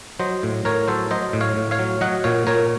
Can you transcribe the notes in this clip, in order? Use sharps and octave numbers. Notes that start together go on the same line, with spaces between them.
F#3 C5 D#5
A2
A2 A#4 C#5
F#3 A4 C5
F#3 C5 D#5
A2
C#5 F5
A2
C#5 F5
F#3
F#3 D#5 F#5
A#2 C#5 F5
A#2 A#4 C#5